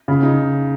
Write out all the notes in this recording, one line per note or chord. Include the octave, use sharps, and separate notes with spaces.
C#3
D#4